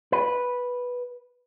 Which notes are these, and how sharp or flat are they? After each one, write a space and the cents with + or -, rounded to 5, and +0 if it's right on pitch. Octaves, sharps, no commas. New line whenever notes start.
B4 -5